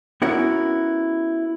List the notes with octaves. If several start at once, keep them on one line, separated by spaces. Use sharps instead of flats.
B3 C#4 E4 F#4 A#4